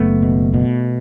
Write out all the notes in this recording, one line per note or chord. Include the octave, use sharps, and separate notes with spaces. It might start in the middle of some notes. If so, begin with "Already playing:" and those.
Already playing: F#1 A3 B3
B2
B2